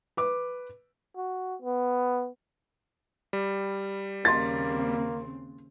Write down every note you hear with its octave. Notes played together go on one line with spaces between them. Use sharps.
B4 D6
F#4
B3
G3
D#2 C#3 A#3 C4 C6 A6